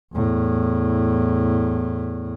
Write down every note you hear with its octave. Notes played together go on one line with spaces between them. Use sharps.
E2 A2